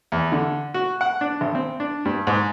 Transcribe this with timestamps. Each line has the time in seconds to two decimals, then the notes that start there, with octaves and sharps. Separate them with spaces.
0.12 E2
0.32 D3
0.74 F#4
1.01 F#5
1.21 D4
1.41 G#1
1.55 C4
1.80 D4
2.05 G2
2.27 G#2